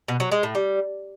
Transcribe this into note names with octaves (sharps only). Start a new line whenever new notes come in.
B2
F#3
G#3
A2
G3